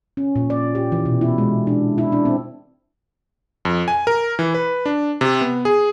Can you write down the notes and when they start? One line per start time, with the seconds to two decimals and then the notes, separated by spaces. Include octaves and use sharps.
0.17 C#4
0.36 A#2
0.50 D5
0.75 G4
0.92 E3
1.05 B2
1.21 E4
1.38 G#3
1.67 D4
1.98 E4
2.12 D4
2.25 C4
3.65 F2
3.88 G#5
4.07 A#4
4.39 E3
4.54 B4
4.86 D4
5.21 C3
5.41 B3
5.65 G#4